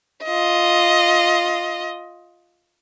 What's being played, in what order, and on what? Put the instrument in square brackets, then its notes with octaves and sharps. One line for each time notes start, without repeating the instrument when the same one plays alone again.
[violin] F4 D#5